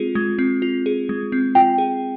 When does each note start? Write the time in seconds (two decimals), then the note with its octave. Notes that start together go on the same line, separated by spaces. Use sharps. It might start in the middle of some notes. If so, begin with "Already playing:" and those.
Already playing: G#3 C4 F4 G#4
0.15 G#3
0.39 C4
0.62 F4
0.86 G#4
1.09 G#3
1.32 C4
1.55 F4 G5
1.78 G#4